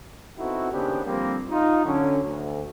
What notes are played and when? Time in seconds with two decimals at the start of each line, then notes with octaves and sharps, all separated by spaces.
0.38 B3 C4 D#4 E4 F#4 A4
0.72 D#2 C#3 B3 D4 G4 C5
1.06 D3 F3 G3 A#3 C4
1.50 D#4 F4
1.85 D3 F#3 C#4
2.25 D2